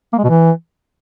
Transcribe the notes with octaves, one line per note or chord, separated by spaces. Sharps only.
A#3
G#3
B2
E3